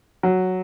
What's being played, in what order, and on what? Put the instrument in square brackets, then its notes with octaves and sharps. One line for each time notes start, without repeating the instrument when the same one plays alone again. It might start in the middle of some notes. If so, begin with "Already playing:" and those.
[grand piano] F#3